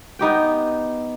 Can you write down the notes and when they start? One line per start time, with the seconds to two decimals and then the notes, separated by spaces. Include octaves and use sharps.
0.19 B3 D#4 G4 G5